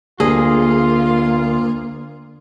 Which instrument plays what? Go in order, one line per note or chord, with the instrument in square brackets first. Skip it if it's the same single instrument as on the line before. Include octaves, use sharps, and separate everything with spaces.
[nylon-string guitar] D2 [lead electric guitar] A#3 [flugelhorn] F4 [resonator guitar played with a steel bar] G#4